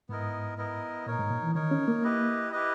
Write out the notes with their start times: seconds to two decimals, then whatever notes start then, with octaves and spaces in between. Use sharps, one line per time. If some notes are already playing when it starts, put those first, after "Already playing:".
0.09 G#2 B3 E4 A#4 D#5
0.58 B3 E4 A#4 D#5
1.06 A#2 D#4 A#4 C#5
1.19 G#2
1.31 A#2
1.43 E3
1.55 D#3 D#4 A#4 C#5
1.71 C#4
1.88 A#3
2.03 E4 G4 B4 D#5
2.52 E4 G4 B4 D#5